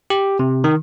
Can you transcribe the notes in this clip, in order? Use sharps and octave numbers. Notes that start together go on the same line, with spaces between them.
G4
C3
D#3